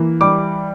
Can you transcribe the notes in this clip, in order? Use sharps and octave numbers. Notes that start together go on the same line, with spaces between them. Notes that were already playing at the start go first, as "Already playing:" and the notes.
Already playing: E3 A#3
G3 D6